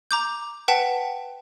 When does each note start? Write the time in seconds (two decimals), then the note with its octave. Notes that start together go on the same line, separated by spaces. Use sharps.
0.11 A#5 D6 G6
0.68 B4 F#5 G5 A5 B6